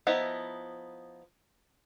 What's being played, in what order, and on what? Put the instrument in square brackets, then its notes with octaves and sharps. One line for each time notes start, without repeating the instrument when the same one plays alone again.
[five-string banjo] F3 B3 D#4 E4